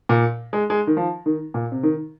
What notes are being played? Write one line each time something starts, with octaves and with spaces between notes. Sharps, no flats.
A#2
G#3
G#3
D#3
F3
D#3
A#2
C3
D#3